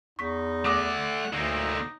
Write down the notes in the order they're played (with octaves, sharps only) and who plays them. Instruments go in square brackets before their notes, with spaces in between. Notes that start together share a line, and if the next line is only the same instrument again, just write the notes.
[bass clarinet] E2 [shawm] D#4 [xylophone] C#6 B6
[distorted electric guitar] A3 D5 [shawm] F#5 [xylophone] D6 D#6 A#6
[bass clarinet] D2 [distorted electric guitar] D3 A#3 [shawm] D#4